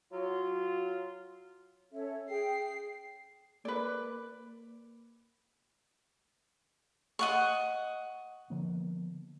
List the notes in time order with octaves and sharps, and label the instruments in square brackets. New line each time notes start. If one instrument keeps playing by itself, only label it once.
[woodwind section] F#3 F4
[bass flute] C#4 [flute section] A4 C#5 E5
[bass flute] G#4 [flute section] G5 [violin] C7
[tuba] A#3 [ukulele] B4 D5
[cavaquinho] D#5 F#5 C#6
[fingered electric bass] D3 F3 A#3 B3